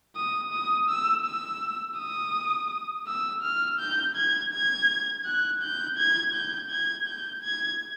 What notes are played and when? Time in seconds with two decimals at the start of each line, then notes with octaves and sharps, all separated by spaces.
0.16 D#6
0.52 D#6
0.89 E6
1.25 E6
1.98 D#6
3.07 E6
3.43 F6
3.79 G6
4.16 G#6
4.53 G#6
5.26 F#6
5.62 G6
5.98 G#6
6.34 G6
6.71 G#6
7.07 G6
7.43 G#6